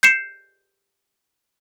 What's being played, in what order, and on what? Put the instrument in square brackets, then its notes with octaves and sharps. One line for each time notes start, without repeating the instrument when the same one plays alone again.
[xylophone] G6 C7 C#7 E7